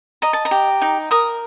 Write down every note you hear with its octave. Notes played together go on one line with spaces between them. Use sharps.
D#5 A#5
A5
A#5
G4
D#4
A#4 D#6